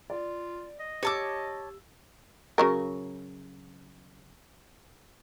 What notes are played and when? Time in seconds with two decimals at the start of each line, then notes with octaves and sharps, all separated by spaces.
0.10 F4 D5
0.80 D#5
1.03 G4 C#5 A5 D6 E6
2.58 C#3 F#3 A#4